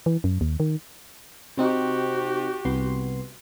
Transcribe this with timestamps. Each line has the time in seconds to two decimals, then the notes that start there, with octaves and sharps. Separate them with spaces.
0.06 E3
0.24 F#2
0.41 D#2
0.60 D#3
1.57 C3 C4 D#4 F#4 G4
2.65 C2 B3 C6